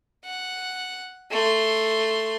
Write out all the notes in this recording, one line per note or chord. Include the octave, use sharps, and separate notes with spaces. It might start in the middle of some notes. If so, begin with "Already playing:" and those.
F#5
A3 C6